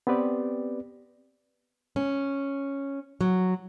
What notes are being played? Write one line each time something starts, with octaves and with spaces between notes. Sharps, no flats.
B3 C4 G4 B4 D5
C#4
F#3